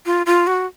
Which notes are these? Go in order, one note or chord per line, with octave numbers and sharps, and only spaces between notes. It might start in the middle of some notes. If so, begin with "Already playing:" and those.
F4
F4
F#4